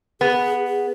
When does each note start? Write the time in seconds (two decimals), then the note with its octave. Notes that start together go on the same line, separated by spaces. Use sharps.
0.21 B3 G#4
0.67 G#4